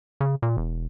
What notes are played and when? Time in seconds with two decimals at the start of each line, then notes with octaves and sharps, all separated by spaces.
0.21 C#3
0.42 A#2
0.57 E1